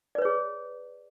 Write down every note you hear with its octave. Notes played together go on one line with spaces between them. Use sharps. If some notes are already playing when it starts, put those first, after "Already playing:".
G#4 B4 C#5 D5